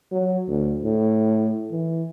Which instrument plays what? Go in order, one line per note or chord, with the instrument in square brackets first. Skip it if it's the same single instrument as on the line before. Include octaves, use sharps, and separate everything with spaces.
[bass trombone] F#3
D2
A2
E3